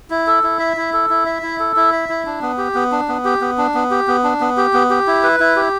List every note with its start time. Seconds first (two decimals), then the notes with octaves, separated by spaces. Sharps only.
0.10 E4
0.27 A4
0.43 E4
0.59 E5
0.77 E4
0.93 A4
1.10 E4
1.26 E5
1.43 E4
1.59 A4
1.76 E4
1.93 E5
2.09 E4
2.26 D4
2.42 B3
2.58 G4
2.75 B3
2.92 D4
3.08 B3
3.25 G4
3.41 B3
3.58 D4
3.74 B3
3.91 G4
4.08 B3
4.24 D4
4.41 B3
4.57 G4
4.73 B3
4.90 G4
5.07 E4
5.23 B4
5.40 E4
5.56 G4